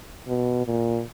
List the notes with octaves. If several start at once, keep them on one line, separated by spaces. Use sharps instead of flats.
B2
A#2